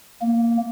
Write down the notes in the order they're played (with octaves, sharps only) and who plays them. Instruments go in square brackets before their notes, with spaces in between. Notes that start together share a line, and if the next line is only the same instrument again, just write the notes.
[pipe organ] A#3